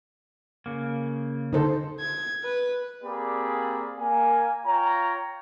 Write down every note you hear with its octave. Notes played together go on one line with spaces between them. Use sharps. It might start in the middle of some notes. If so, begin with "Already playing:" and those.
C#3 A#3
D3 D#4 A4 C5
G#6
B4
A#3 C4 G4 G#4 D5 B5
A#3 G#5
F4 C#5 G5 A#5